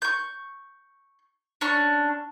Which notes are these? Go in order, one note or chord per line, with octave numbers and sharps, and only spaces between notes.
C#6 G6
C#4 D4 C#6 F6